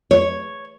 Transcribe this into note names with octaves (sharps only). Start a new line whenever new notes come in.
C#5